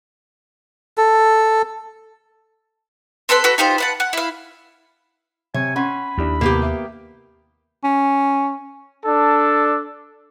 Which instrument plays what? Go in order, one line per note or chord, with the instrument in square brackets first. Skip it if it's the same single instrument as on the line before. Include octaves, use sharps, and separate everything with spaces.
[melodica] A4
[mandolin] C4 A4 B4 C6
F#4 A4 B4
D#4 F4 G4 C5
B4 F#5 A5
F#5
E4 F5
[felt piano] C3 [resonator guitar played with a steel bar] C#5 [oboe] G#5
[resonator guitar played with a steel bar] C#4 [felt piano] F#5 C6 [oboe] B5
[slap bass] D#2 [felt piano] D4 E4 G4
[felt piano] C2 [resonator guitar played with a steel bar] A#3 B3 G4
[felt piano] E5
[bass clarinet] C#4
[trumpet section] D4 A4